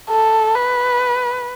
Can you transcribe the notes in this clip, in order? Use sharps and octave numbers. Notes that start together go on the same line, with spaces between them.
A4
B4